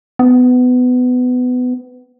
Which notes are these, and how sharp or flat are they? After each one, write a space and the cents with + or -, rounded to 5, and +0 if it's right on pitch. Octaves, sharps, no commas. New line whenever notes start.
B3 +20